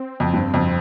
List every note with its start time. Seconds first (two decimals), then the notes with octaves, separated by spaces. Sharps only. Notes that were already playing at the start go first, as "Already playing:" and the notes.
Already playing: C4
0.20 F2
0.33 G2
0.54 F2